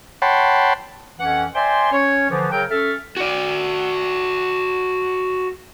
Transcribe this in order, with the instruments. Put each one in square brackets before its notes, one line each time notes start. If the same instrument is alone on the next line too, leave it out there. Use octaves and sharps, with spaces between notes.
[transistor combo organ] C#5 F#5 G5 A5 B5 C6
[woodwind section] F2 E3 C#4 F#5
C5 D5 E5 G5 G#5 C6
C#4 C#5
D3 E3 F3
C#3 F#3 A#4 G5
C#4 A4 E5 F6
[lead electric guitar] F#4 D5